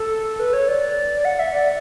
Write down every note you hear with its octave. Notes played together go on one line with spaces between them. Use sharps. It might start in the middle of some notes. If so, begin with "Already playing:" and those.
Already playing: A4
B4
C#5
D5
F#5
E5
D5